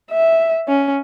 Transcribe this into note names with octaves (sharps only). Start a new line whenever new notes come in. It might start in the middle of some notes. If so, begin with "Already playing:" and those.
E5
C#4